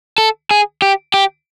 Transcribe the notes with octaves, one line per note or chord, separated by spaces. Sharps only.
A4
G#4
G4
G4